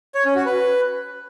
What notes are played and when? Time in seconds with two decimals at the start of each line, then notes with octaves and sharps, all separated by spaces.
0.15 C#5
0.25 C#4
0.35 F#4
0.46 B4